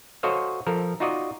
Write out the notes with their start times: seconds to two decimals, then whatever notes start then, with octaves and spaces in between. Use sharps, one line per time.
0.23 F#4 A4 C5 C#5 D#5 F5
0.67 F3 A4 A#4
1.00 D#4 F4 F#4 D5 D#5